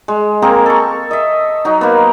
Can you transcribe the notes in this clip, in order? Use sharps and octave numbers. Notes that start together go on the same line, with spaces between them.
G#3
A#3 C4 G#4 A#4
A4 C#6
D#5 E5
F#3 D#4
A#3 B3